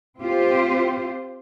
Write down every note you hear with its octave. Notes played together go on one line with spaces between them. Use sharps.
C4 F4 G4 C5